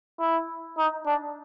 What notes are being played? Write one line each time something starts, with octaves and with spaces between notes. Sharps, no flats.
E4
D#4
D4